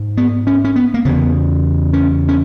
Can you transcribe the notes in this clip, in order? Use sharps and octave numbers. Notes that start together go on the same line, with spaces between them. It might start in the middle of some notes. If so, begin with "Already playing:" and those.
Already playing: G#2
B3
C#4
C#4
B3
A#3
E2 C#3 B3
C#4
C#4